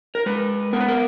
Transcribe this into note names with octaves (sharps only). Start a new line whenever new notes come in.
A#4
G#3 B4
B3 A#4
B4
A#4